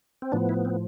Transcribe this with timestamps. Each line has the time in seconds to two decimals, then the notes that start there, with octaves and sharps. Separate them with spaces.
0.22 C4
0.32 A2 F3 B3 D4
0.49 E4
0.65 C4